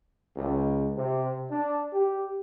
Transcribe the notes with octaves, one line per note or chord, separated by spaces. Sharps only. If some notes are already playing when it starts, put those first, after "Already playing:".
C#2
C3
D4
G4